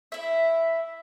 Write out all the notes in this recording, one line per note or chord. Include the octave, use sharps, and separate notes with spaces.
E4 E5